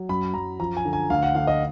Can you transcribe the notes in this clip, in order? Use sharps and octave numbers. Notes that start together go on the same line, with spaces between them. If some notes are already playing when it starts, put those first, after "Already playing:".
Already playing: F#3
F#2 B5
F#2 A#5
F3 A#5
G#5
D3
G#5
D2 F5
F#5
D3 F5
D#5